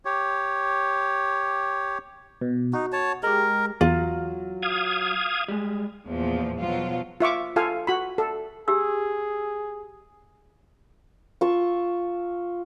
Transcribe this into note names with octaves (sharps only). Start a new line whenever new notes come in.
G4 C#5
B2
D#4 F#4
C#5 A5
G#3 G4 A#4
E2 F#3 F4
F5 D#6 G#6
G3 G#3
E2 A#2 F3
B2 F3 F#3 F4
F4 E5 C#6 D6
F4 A4 F5 G#5
F#4 B5
A4
G4 G#4 E6
F4 A5 C#6 E6